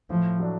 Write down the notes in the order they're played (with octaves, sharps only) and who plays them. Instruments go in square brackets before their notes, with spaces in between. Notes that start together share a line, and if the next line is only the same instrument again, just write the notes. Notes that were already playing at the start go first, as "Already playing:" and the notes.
[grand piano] A2 [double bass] F3
[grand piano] F#3 A3 D4